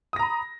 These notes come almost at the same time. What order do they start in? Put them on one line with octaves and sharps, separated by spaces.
D#6 A#6 A#5 B5